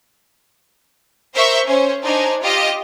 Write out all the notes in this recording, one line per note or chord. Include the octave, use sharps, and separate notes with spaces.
A#4 C5 E5 C#6 G6
C#4 C5
D4 D#4 C5 G#5
F4 G4 D#5